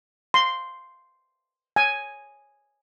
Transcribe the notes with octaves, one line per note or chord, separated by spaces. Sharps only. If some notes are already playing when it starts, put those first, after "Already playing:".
C6
G#5